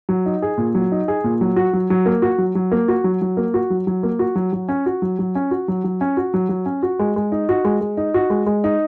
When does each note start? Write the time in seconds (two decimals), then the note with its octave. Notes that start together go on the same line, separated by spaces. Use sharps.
0.09 F#3
0.26 D#4
0.42 G#4
0.58 A#2
0.75 F#3
0.92 D#4
1.08 G#4
1.24 A#2
1.41 F#3
1.56 F#4
1.73 F#3
1.90 F#3
2.06 A#3
2.22 F#4
2.38 F#3
2.55 F#3
2.71 A#3
2.88 F#4
3.04 F#3
3.22 F#3
3.37 A#3
3.54 F#4
3.70 F#3
3.87 F#3
4.03 A#3
4.19 F#4
4.36 F#3
4.53 F#3
4.69 C#4
4.86 F#4
5.02 F#3
5.19 F#3
5.35 C#4
5.51 F#4
5.68 F#3
5.84 F#3
6.01 C#4
6.17 F#4
6.34 F#3
6.49 F#3
6.66 C#4
6.83 F#4
6.99 G#3
7.16 G#3
7.32 D#4
7.49 F#4
7.65 G#3
7.81 G#3
7.97 D#4
8.14 F#4
8.30 G#3
8.46 G#3
8.64 D#4